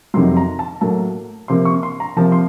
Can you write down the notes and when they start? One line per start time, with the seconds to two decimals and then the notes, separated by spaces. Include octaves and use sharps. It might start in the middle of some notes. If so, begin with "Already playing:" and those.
0.14 F2 C3 D#3 F#3 C6
0.37 A#5
0.59 A5
0.81 A2 F#3 A#3 A5
1.48 C3 F3 A#3 C6
1.65 C#6
1.83 C6
2.00 A#5
2.16 C3 F3 A#3 A5
2.32 C6